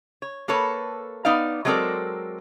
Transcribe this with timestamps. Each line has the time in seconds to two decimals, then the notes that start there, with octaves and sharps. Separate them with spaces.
0.22 C#5
0.48 A#3 A4 B4 C#5
1.25 B3 D#4 D5 F5
1.65 F#3 G#3 C4 A4 A#4 D5